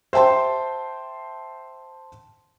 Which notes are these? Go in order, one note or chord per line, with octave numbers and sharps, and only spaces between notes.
C5 E5 G5 A5 C6